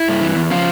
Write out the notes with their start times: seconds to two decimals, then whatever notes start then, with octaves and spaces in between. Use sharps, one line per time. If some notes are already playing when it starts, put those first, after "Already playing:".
Already playing: E4
0.08 G2
0.21 E3
0.36 E2
0.50 C#3 F3 F4